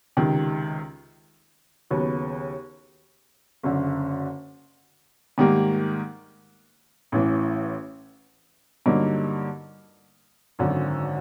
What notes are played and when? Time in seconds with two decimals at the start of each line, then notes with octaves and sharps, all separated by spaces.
0.17 C#2 C3 D#3
1.90 D#2 C#3 F#3 B3
3.64 F#1 F#2 D3
5.38 G#2 D#3 G3 A#3
7.12 A1 A2 E3
8.86 G2 D3 F#3 A#3 D#4
10.59 G#1 F#2 D3